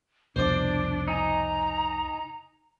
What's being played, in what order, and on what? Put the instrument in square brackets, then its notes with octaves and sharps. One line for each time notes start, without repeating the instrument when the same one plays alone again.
[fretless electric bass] C2 F2 B2 [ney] D4 [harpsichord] C5 D5
[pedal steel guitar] D#4 G#5 [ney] A#5